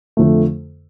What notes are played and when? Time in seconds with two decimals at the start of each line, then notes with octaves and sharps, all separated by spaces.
0.17 F2 D3 F3 A3